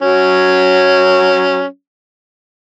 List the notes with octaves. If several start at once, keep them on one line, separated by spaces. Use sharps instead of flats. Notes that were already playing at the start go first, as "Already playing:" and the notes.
F#3 C#4